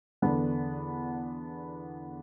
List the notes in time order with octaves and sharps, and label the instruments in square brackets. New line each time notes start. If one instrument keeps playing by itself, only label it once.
[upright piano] E2 D3 B3 D4